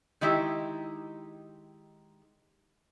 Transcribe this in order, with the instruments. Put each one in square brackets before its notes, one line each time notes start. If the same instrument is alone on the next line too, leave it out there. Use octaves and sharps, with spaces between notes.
[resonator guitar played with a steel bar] D#3 G#3 D#4 E4 G4